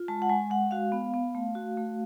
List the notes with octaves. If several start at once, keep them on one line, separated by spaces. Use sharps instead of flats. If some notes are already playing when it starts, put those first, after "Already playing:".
Already playing: F4
G#3 A5
F#5
G#3 G#5
G#3 F#5
F#4 F5
B3
B3
A3
F#4
A3